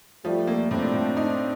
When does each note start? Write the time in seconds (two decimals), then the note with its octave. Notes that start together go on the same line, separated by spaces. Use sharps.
0.24 F3 G3 A3
0.47 A#3
0.70 A2 C4 D4
0.93 A2
1.17 D#4